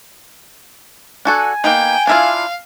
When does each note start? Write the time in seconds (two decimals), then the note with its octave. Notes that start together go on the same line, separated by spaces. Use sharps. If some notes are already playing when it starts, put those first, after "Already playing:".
1.25 D4 F#4 A4 G#5
1.64 A#3 B3 D#4 G5
2.07 D4 E4 F4 F5